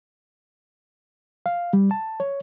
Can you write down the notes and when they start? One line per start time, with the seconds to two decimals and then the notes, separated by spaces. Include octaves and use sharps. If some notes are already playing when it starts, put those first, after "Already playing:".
1.46 F5
1.73 G3
1.91 A5
2.20 C#5